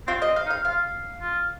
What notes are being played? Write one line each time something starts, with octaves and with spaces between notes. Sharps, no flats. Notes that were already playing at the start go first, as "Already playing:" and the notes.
C4 F4
D#5
C4
F5
D#4
F5
F4 F5
F4